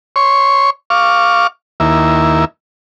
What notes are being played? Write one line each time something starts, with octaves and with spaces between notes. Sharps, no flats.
C#5 C6 C#6
F5 C#6 D6
D#2 A#3 E4